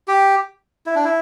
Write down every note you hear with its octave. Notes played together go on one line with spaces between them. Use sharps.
G4
E4
D4
E4